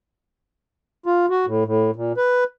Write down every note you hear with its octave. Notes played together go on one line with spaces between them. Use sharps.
F4
F#4
A2
A2
A#2
B4